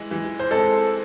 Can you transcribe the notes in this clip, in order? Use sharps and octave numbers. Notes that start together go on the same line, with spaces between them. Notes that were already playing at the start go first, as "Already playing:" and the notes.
Already playing: E3 G#3
E3
C5
G#3 C4 A4